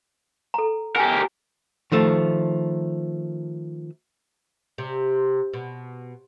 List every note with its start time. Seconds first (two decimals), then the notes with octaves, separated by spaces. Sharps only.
0.54 A4 A#5
0.96 G4 A#4 G5 G#5
1.92 D#3 F3 A3
4.78 C3
5.53 B2